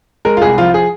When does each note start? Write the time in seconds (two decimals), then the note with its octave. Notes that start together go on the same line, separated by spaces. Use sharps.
0.25 G#3 A#4
0.37 F4
0.42 C2 G#4
0.58 F3 F4
0.74 G#4